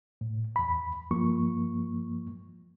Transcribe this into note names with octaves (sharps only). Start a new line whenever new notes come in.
A2
E2 B5
G2 F3 A#3 C#6